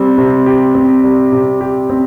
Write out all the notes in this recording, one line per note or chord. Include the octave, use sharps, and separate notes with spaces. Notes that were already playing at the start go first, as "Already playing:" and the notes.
Already playing: G3 C4
C3
G4
C4
G3
C3
G4
C4